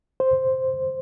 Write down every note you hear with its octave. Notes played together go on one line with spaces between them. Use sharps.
C5